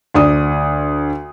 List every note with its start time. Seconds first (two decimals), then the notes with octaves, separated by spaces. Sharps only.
0.14 D2 D5 D#6